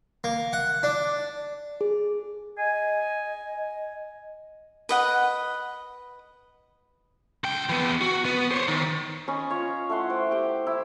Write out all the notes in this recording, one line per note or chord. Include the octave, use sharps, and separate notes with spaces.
A#3
F#5
D4
G#4
D#5 G#5
B4 D#5 F#5
C#2 G5
E3 B3
F#4
B3
C5 C#5
D#3
C#4 D#5 B5
F4 C#5
A3 E4 F#5 C6
C5 G5
G4 G5
E4